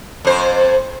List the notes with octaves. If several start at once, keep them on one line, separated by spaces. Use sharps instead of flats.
F2 C5